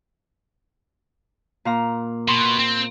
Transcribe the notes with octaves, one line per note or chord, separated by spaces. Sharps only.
A#2 F5 A#5
B2 C6
C4